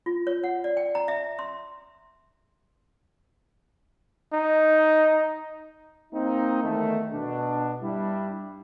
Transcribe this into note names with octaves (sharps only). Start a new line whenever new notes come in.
F4
C#5
F#5
D5
G5
A#5
E5
C6
D#4
A#3 C4 D#4
E2 D#3 A3
B2 D4
G2 G3 D4 E4